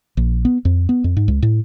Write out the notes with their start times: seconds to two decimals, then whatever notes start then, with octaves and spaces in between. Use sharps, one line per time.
0.17 A#1
0.45 B3
0.65 F2
0.89 B3
1.04 F2
1.17 G#2
1.28 C#2
1.43 A2